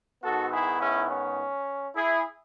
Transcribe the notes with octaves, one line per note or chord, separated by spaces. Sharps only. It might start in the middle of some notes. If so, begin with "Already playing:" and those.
G#2 D#3 G#3 B3 F#4 A4
E4 G#4
C#4 E4
C#4
E4 G#4